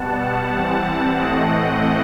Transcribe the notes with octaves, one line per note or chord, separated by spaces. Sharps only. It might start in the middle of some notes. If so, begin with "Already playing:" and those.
Already playing: B2 G3 B3 F#5 A5
E3 G3 C4
A2 E3 A3 C4 D#5 F#5